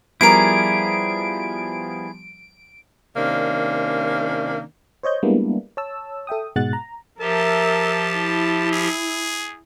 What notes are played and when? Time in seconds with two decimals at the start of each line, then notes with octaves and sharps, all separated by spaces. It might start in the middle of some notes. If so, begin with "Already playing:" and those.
0.21 F3 G3 B3 E4 G#4 A#4 D5 D7
3.15 C3 D#3 A#3 C#4 D4
5.03 C5 C#5 D#5 G6
5.23 G3 G#3 A#3 B3 D4 E4
5.77 C#5 A5 E6
6.27 A4 E5 G5 D#6
6.56 G#2 B2 G#3 F#5 F#6 A6
6.73 A#5
7.20 F3 G4 A#4 E5 A5
8.18 E4
8.72 G#4